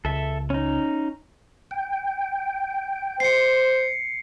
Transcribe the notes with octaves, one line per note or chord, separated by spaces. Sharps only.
C#2 A4 E5
C#4 D#4
G5
C5 C7 C#7